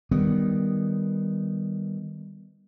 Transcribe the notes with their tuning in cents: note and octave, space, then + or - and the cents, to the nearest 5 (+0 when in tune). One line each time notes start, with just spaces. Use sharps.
D#3 +0 G3 +5 B3 +0